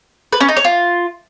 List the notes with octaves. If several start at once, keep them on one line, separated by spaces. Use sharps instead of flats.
B4
C#4
D#4
C#5
F4